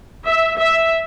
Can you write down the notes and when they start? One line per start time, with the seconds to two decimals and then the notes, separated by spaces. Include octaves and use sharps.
0.24 E5
0.57 E5